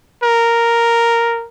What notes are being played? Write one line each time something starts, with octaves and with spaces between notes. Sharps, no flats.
A#4